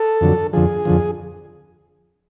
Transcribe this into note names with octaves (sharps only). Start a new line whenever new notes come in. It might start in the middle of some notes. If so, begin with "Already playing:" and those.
Already playing: A4
F2 D3 F#3
F2 D3 F3 G#4
F2 D3 F3